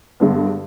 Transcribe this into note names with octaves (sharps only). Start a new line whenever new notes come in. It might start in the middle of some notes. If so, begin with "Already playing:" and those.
G2 D3 G#3 B3